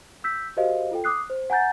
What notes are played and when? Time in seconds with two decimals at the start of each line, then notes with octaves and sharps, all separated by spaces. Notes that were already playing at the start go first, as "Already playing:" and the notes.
0.24 E6 G6 B6
0.57 F#4 G4 A#4 C5 D#5 F5
0.92 F4 A4 G5
1.04 D6 D#6 F#6 C7
1.30 C5
1.50 F#5 G#5 A#5 G6 A6